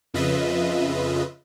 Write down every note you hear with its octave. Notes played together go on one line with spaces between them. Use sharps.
F2 C#3 F4 B4 D#5 E5